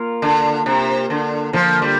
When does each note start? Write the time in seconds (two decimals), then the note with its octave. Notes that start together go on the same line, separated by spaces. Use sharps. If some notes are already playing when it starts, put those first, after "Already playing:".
Already playing: A#3 F4 A#4
0.22 D3
0.66 C3
1.10 D3
1.53 D3 F3 A#3 F4 C5
1.82 G3